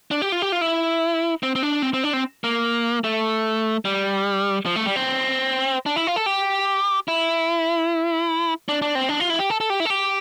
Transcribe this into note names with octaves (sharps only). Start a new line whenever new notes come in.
D4
G4
F4
G4
F4
E4
C4
C4
D4
C4
C4
D4
C4
A#3
A3
G3
F3
A3
G3
C4
D4
E4
F4
A4
G4
E4
D4
D4
C4
D4
F4
E4
G4
A4
A4
G4
E4
A4
G4